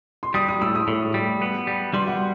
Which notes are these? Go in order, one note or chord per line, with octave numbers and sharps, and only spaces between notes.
C6
G3 D#6
D#6
A2 E6
D#6
A2
G3
B3
G3
G3 C6
F#5